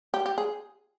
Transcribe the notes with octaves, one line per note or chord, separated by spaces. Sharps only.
G4
G4
G#4